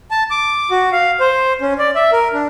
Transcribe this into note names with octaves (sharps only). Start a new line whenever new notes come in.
A5
D6
F#4
F5
C5
C#4
D5
E5
A#4
D4